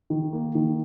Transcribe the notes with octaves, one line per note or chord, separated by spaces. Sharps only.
D#3
A#3
D#3